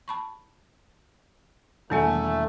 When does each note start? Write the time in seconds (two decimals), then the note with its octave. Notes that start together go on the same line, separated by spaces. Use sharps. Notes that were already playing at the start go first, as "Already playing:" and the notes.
0.08 A5 B5 C#6
1.90 E1 D#3 F#3 A3 A#3 A4 G#5